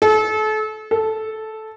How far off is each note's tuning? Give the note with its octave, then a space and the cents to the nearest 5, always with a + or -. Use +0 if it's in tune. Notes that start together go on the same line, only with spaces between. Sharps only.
A4 -35
A4 -10